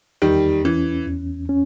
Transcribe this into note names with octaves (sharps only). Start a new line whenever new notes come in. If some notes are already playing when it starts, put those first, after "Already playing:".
E2 D#3 G3
E3 C#4
E2
C#4